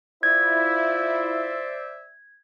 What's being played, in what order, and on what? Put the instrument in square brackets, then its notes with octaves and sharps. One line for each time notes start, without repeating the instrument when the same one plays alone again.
[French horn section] E4 F4 [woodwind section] C5 D5 E5 [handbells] G#6